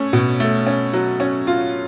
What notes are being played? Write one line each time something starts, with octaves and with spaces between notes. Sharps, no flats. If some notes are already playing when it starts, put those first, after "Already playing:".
Already playing: A3 C#4
B2
A3
C#4
F#3
C#4
F4